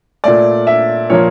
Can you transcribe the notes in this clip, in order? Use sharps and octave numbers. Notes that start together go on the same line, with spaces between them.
A#2 A3 D5
E5
A#2 F3 A#3 C#5